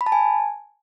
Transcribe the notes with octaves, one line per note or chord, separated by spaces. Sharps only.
B5
A5
G#5